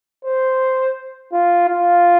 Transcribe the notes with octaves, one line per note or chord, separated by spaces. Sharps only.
C5
F4
F4